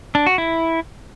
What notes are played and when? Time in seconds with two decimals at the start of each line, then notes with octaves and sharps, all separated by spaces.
0.15 D4
0.26 F#4
0.38 E4